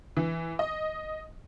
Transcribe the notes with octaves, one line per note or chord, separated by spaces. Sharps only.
E3
D#5